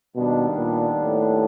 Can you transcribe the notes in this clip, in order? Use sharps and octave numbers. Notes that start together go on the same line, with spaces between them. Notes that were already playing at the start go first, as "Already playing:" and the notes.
D#2 B2 D#3 G3 B3 D4
A#2
A2